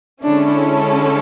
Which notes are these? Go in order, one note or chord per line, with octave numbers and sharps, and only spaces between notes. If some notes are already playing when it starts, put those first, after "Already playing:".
D3 G#3 C#4 D4 E4 A4